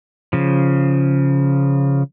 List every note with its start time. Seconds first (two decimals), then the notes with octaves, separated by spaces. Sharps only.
0.33 C#3 F3